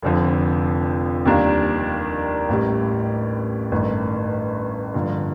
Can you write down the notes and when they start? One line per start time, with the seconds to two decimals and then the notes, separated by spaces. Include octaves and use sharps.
0.03 F1 F2 D3 F3
1.25 D#2 D#3 G3 A#3 D4
2.49 A1 A2 G3
3.72 A1 G2 D#3 A3
4.94 G2 D3 F3 A#3